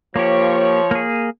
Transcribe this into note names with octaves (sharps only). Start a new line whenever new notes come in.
F3 A#3 G4 C#5
A#3 G#4